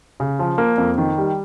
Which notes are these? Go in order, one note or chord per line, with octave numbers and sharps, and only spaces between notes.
C#3
F3
A#3
F2
D#3
G3